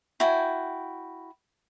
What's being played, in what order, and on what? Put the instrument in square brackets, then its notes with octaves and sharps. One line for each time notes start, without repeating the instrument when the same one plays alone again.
[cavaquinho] E4 F#4 G5 G#5